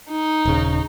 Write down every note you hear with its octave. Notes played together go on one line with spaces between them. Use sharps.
D#4
D#1 C#3